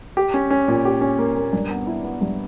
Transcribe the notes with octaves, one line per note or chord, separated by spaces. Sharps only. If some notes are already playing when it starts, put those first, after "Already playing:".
G4
C#4
C#4
A#2
G4
C#4
A#3
A#3
G2
B3
E4
B3
G2